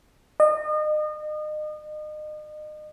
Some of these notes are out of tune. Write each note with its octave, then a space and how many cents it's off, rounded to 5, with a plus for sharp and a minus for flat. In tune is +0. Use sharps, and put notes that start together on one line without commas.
D#5 -35